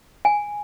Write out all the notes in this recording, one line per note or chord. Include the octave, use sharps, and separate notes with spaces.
G#5